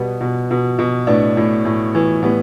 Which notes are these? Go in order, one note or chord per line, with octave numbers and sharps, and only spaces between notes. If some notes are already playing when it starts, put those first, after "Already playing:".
Already playing: B2 G3 B3
B2
B2
B2
A2 B3 D4
A2
A2
E3
A2 G3 B3